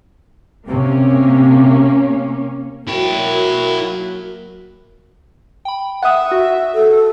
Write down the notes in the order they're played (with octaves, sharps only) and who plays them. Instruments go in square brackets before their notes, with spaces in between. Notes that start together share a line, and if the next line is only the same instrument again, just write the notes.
[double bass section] C3 [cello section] A#3 C#4
[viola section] F#3 A#3 [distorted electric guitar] E4 G5
[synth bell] G5 B5
[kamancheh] E5 [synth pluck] F#5 D#6
[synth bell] F#4
[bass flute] A4